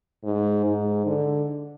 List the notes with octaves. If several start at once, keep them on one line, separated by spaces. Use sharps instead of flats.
G#2
G#2
D3